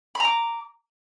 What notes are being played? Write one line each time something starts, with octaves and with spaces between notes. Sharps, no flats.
A#5 B5 D6